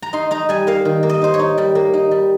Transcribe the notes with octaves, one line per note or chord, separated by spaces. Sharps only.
A#5
D#4 C6
D#4 A#5
G3 G#5
A#3 F5
D#3
A#3
D#5
D#4 C5
C#5
D#4
G3
A#3
D#4
G3